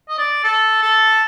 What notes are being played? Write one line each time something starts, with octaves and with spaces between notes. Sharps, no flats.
D#5
D5
A4
A4